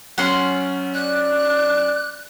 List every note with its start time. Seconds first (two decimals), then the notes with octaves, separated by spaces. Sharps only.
0.18 F#3 C#4 F#5 C6
0.94 D5 F#6